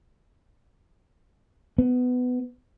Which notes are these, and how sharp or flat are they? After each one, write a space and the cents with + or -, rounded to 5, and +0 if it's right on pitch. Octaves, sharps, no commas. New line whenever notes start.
B3 +15